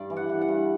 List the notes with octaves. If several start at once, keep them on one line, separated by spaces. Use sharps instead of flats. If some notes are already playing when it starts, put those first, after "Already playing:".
Already playing: G2 D5
E3
F#5
E3
F#5
G2